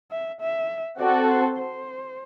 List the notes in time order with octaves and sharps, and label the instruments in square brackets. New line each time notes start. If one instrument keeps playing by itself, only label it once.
[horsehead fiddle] E5
E5
[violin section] C4 F#4 A4 [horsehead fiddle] D5
[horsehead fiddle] C5
C5